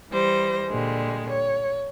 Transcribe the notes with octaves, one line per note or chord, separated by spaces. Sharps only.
E3 G3 C5 A#6
A#2 D3 G3 G#3
C#5